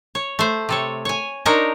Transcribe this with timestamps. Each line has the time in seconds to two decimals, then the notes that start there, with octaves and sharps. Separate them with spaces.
0.15 C#5
0.39 A3 C5
0.69 C3 A4 C#5
1.05 C#5 G#5
1.46 D4 D#4 A#4 C5 C#5 D#5